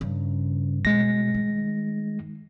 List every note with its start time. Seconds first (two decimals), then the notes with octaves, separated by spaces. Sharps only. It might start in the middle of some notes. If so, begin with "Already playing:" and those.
0.01 G2 C#3
0.85 B2 G#3 A#6
1.34 D#3